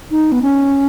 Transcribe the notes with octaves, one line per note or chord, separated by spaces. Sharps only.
D#4
B3
C#4